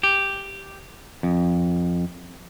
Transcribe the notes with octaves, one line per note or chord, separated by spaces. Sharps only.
G4
F2